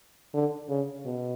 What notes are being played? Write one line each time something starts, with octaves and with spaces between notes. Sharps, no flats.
D3
C#3
B2